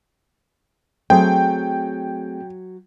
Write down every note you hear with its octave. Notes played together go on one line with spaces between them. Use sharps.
F#3 A3 C4 G#4 G5